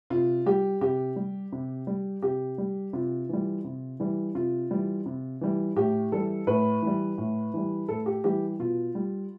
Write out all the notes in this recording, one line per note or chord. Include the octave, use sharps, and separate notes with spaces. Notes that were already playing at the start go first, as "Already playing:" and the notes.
C3 F4
G3 G4
C3 G4
G3
C3
G3
C3 G4
G3
C3 F4
E3 G3
C3
E3 G3
C3 F4
E3 G3
C3
E3 G3
A2 G4
E3 G3 A4
A2 B4
E3 G3
A2
E3 G3
A2 A4
G4
E3 G3 G4
B2 F4
G3